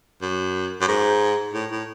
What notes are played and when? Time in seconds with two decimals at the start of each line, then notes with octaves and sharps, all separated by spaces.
0.22 F#2
0.81 F#2
0.88 G#2
1.54 A2
1.71 A2